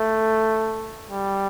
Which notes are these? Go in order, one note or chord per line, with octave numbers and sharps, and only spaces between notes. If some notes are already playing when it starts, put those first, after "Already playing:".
Already playing: A3
G3